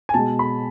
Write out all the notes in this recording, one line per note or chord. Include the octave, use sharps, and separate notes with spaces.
G#5
B2 G#3 A5
B5